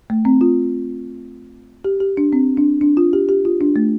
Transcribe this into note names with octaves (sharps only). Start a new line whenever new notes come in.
A3
C4
F4
G4
G4
D4
C4
D4
D4
F4
G4
G4
F4
D4
A3